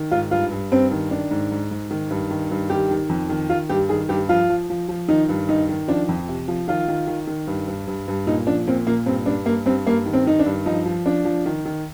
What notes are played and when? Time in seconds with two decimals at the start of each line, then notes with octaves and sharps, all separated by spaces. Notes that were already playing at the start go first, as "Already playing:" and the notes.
Already playing: D#3
0.11 G#2 F4
0.31 G2 F4
0.51 G2
0.71 G2 C4
0.91 D#3
1.11 D#3 D4
1.31 G#2
1.51 G#2
1.71 G#2
1.91 D#3
2.10 G2
2.31 D#3
2.51 G2
2.70 D#3 G4
2.91 D#3
3.09 F2
3.29 D#3
3.49 D#3 F4
3.69 G2 G4
3.89 D#3 G#4
4.09 G2 G4
4.29 F3 F4
4.49 F3
4.70 F3
4.89 F3
5.08 D#3 D#4
5.29 G2
5.49 D#3 D#4
5.69 D#3
5.88 F3 D4
6.09 F2
6.29 C3
6.48 F3
6.67 D#3 F4
6.88 D#3
7.07 D#3
7.27 D#3
7.47 G2
7.68 G2
7.87 G2
8.08 G2
8.27 A#2 D#4
8.46 F3 D4
8.68 A#2 C4
8.87 A#2 A#3
9.06 G2 C4
9.26 G2 D4
9.46 G2 A#3
9.66 G2 C4
9.86 G2 A#3
10.06 D#3
10.13 C4
10.26 D#3 D#4
10.39 D4
10.46 G2
10.66 F3 D#4
10.86 F3
11.06 F3 D4
11.25 F3
11.46 D#3
11.65 D#3